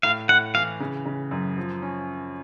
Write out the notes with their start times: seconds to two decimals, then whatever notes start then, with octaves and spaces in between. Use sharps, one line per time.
0.03 A2 F5
0.29 A2 F#5
0.55 E3 F5
0.80 C#3
1.06 C#3
1.31 F#2
1.58 F3
1.82 C#4